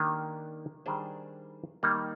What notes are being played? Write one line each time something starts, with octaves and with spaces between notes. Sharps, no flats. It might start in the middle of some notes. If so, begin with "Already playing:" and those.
Already playing: D#3 A#3 D4 G4
D#3 G3 D4 G#4 C5
D#3 G3 A#3 D#4